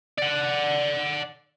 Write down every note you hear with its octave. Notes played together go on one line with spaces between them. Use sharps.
D5 F#5